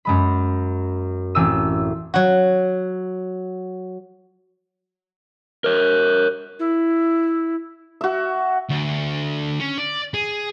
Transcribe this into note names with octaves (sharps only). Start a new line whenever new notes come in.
F#2 G#3 B5
A1 C4 A5 D6 E6 D#7
F#3 F#4
A#4 C#5
E4
F#4 E5
D2
C#4
D5
G#4